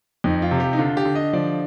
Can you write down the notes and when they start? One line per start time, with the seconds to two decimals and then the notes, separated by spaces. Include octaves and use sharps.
0.24 F2 D#4
0.42 F4
0.51 C3
0.60 G4
0.73 D#4
0.78 D3 F4
0.97 G4
1.05 D3
1.15 D#5
1.33 F3 D5